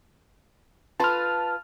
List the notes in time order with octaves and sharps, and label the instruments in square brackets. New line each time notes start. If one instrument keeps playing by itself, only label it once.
[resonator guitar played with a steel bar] F4 B4 [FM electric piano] A5 F6